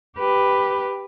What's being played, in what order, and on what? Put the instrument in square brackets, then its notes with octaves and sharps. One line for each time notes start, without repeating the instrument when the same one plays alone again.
[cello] G4 B4